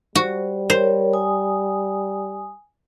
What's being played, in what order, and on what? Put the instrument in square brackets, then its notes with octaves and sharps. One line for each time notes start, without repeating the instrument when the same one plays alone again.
[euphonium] G3 [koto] F#4 [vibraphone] C5
[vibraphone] A#4 C#5 [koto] C5
[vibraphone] G#5 D#6